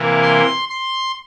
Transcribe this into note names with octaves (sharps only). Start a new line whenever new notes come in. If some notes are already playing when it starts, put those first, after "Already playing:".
Already playing: C3 E3 A#3
C6
C6